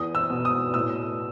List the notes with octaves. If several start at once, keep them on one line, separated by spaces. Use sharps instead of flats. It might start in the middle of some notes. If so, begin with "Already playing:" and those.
Already playing: E2 D#6
E6
B2
D#6
A2 E6